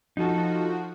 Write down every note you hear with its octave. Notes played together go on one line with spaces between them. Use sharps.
F3 D#4 F#4 A4